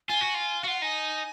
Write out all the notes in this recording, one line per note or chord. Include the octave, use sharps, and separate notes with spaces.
F4 G#5
F#4
F4
F#4 F5
F4 F#5
D#4 G#5